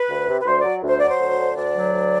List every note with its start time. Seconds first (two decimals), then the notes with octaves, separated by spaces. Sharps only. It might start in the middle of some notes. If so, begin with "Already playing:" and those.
Already playing: B4
0.09 D2
0.27 C3
0.42 B4
0.46 D2 C5
0.60 F#3 D5
0.83 D2 C5
0.99 F#3 D5
1.11 C5
1.19 D2
1.38 D3
1.57 D2 D5
1.75 F#3
1.94 D2